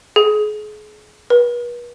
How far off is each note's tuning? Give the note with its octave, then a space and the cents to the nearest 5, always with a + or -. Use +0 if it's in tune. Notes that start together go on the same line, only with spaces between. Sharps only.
G#4 +35
B4 -45